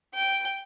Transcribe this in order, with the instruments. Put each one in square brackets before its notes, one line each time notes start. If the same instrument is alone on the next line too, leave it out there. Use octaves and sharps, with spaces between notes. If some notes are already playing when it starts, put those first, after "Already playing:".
[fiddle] G5